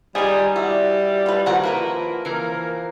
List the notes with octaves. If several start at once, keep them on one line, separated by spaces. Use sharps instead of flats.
G3 D#4 F4 G#4 G5 G#5
G3 E4 F#4 D5 E5
F4 B4
D#3 F3 F#4 A#4 F#5
A#3 E4 A#4 B4
E3 A#3 A#4